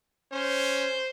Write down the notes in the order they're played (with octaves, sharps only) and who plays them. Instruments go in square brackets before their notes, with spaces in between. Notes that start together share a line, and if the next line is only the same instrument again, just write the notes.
[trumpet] C#4 [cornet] C5